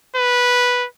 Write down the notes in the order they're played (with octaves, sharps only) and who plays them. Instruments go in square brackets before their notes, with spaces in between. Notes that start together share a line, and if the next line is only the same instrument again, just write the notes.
[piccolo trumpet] B4